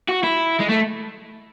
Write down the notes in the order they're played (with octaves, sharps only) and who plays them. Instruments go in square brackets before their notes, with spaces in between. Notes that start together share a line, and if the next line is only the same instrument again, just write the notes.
[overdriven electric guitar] F#4
E4
G#3
A3